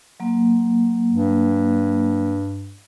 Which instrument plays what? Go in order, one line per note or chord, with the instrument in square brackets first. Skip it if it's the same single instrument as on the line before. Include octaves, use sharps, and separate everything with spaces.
[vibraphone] F#3 A#3
[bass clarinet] G2